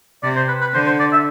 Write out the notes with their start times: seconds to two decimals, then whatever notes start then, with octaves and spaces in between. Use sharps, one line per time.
0.23 C3 D5
0.36 C5
0.48 B4
0.61 B4
0.74 D3 C5
0.86 C5
1.00 D5
1.12 E5